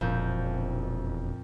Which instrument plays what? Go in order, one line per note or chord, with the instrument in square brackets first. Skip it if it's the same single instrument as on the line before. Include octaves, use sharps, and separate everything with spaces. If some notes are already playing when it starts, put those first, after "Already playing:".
[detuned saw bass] E1 [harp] F2 A#2 G6